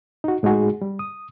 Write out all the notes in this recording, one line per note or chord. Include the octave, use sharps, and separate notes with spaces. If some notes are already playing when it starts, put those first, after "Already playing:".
D#4 F#4
A2 G#3 D#4 F#4 G#4
G3
D#6